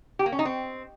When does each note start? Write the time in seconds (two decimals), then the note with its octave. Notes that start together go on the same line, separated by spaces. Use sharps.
0.19 G4
0.26 A#3
0.32 C#4
0.39 D#4
0.45 C4